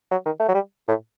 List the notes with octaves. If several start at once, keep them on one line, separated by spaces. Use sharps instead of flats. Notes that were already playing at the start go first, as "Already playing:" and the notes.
F#3
D#3
A3
F#3
G3
A2